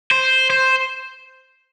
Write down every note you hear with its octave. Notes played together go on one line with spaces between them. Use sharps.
C5
C5